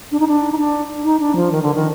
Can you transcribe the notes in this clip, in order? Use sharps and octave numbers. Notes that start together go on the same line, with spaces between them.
D4
D#4
D4
D#4
D4
D#4
D4
F3
D#3
D3
D#3